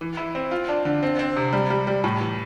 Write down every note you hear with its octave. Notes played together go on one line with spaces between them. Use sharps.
E3
E4
C4
F4
D4
D3
C4
C4
C3
G3
G3
G3
A2
E3